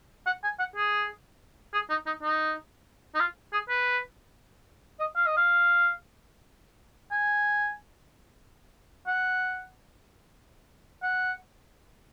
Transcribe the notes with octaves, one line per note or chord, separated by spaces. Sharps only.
F#5
G#5
F#5
G#4
G#4
D#4
D#4
D#4
D#4
F4
G#4
B4
D#5
F5
D#5
F5
G#5
F#5
F#5